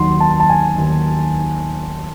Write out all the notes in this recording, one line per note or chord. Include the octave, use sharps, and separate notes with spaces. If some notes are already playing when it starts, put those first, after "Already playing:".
Already playing: D#2 D#3 F#3 C6
A5
A5
G#5
D#2 D#3 F#3